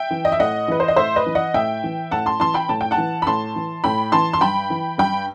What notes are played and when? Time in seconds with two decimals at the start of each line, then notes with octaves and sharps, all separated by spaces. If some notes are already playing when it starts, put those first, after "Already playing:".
Already playing: E5 G5
0.11 E3
0.25 D#5
0.32 E5
0.39 A2 D#5 F#5
0.68 E3 B4
0.80 C5
0.88 D#5
0.96 A2 C5 E5
1.16 B4 D#5
1.26 E3
1.35 D#5 F#5
1.54 A2 E5 G5
1.84 E3
2.11 A2 F#5 A5
2.26 A5 C6
2.40 E3 A5 C6
2.54 G5 B5
2.69 A2 A5
2.81 G5
2.91 F#5 A5
2.98 E3
3.22 B5
3.27 A2 A5 C6
3.56 E3
3.84 A2 G5 B5
4.12 E3 A5 C6
4.33 C6
4.41 G2 G5 B5
4.70 E3
4.98 G2 G5 B5